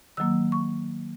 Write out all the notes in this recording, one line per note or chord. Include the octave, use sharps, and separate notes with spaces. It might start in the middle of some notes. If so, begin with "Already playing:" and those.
D#3 F#3 A#3 E6
C#6